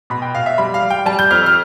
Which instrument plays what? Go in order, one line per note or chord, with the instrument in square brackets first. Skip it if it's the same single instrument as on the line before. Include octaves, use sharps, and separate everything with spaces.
[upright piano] B2 B5
G5
B2 F5
E5
G3 B5
F5
G3
G5
G3 A5
G6
F2 F6
F6